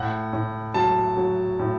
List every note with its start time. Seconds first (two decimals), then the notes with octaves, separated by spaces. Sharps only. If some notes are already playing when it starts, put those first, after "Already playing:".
Already playing: A2 F#5
0.33 A2
0.74 F#3 A5
1.17 F#3
1.59 A2